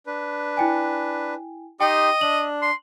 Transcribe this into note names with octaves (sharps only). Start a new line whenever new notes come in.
D4 B4
E4 G5 G#5
D#4 G4 D#5 G5 C6
D4 F#7
C6